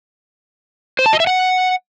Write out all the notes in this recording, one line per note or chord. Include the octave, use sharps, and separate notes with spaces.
C5
A5
D#5
E5
F#5